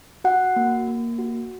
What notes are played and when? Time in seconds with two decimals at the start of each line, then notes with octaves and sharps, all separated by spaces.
0.24 F#4 F#5
0.56 A#3
0.88 A#3
1.19 F#4